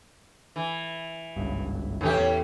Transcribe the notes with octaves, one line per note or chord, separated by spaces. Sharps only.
E3
G#1 C#2 G2
E2 A2 C3 E3 C#4 G4
E2